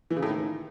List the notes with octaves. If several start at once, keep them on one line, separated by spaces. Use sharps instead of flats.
E3
C#3
A2
D#3